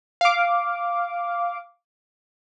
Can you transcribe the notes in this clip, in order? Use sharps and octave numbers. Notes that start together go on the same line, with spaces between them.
F5 D6